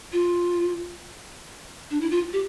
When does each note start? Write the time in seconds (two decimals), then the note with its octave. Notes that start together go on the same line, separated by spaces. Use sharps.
0.13 F4
1.91 D4
2.01 E4
2.11 F4
2.33 G4